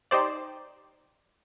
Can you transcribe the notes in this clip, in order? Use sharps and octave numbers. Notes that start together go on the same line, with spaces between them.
D#4 G4 C5 D5